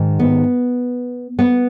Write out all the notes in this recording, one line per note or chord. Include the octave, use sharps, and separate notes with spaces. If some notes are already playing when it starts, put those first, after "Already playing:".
Already playing: G#2 D#3
B3
B3